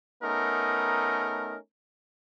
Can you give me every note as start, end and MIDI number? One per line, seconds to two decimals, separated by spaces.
0.23 1.56 57
0.23 1.56 59
0.23 1.56 61
0.23 1.56 63
0.23 1.56 70